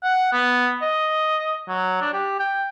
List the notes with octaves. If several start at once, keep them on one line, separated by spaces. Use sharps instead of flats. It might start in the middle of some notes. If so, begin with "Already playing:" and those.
F#5
B3
D#5
F#3
D4
G4
G5